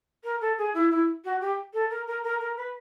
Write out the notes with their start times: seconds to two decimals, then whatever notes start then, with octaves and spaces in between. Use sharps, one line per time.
0.23 A#4
0.40 A4
0.57 G#4
0.73 E4
0.90 E4
1.24 F#4
1.40 G4
1.73 A4
1.90 A#4
2.06 A#4
2.23 A#4
2.40 A#4
2.56 B4